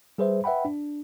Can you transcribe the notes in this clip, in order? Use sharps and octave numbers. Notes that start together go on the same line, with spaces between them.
G3 G#4 B4 C5 E5
B4 E5 F#5 G5 B5
D4